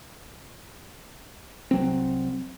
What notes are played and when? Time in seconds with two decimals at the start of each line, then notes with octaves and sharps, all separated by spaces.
1.71 C2 F#3 C4